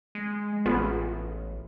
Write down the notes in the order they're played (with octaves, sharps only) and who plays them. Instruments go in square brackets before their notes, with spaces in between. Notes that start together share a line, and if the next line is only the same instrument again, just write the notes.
[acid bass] G#3
[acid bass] A1 [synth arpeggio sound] B3 F4 G#4